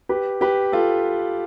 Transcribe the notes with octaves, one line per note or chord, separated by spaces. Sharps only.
G4 B4
G4 B4
F4 A4